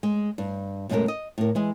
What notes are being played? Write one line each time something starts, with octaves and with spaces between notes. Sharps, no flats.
G#3
G2
F#2 B2 G#3 A3 B3 A#4
D#5
A2 A#4
E3 G#3 D#5